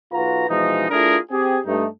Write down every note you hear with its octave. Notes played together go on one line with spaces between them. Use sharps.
B1 F4 F#4 B4 A#5
B2 E3 F3 G#3 D#4
A3 D4 E4 F4 G#4 A#4
C4 G4 G#4
G2 A3 D#4